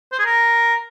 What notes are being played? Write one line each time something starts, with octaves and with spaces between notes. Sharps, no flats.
C5
G#4
A#4